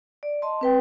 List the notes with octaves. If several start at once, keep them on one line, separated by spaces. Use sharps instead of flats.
D5
D#5 A5 C6
C4 B4 G5